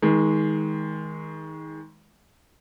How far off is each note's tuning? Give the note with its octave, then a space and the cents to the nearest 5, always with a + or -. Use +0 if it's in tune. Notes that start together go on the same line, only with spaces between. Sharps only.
D#3 +30 G#3 +0